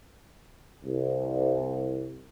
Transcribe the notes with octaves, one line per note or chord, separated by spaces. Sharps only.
C2